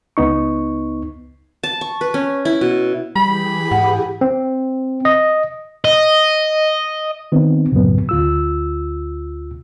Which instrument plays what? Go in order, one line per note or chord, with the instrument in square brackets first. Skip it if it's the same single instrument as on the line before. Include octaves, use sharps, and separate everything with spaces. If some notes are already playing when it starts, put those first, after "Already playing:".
[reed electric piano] C#2 B3 D#4 C#6
[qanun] A5
C#6
B4
C#4
E4
B2
[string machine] E3 G4 G#4 [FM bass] G3 [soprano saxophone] B5
[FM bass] G#2 [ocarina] F#5
[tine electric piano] C4
D#5
[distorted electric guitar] D#5
[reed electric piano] D#3 B3 C4 D#4
C#2 F#2 A2 C#3 F#3 B3
D2 F4 E6